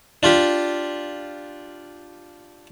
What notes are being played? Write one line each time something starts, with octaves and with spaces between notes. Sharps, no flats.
D4 F4 G4